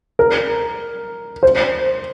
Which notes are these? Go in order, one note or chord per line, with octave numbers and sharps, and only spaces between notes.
A#4
C5